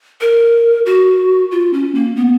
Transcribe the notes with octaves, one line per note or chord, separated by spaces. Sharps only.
A#4
F#4
F4
C#4
A#3
B3